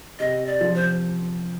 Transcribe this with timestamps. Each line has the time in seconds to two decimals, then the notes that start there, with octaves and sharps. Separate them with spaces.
0.19 C3 D#5
0.46 D5
0.61 F3
0.75 C5